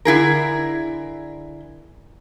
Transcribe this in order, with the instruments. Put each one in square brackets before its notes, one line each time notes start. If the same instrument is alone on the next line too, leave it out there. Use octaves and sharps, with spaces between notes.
[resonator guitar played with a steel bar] D3 E4 G#4 A#4